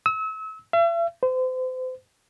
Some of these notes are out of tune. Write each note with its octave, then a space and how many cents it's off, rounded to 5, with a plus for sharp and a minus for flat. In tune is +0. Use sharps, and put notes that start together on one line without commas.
E6 -35
E5 +45
C5 -35